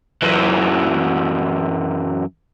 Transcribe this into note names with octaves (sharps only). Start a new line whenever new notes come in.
F#2 E3